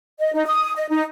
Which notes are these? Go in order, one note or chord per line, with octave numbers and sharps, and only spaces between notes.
D#5
D#4
D#6
D#5
D#4